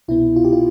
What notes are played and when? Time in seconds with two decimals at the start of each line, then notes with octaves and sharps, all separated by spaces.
0.08 C2 B2 B3 E4
0.36 F4
0.44 G4
0.53 F4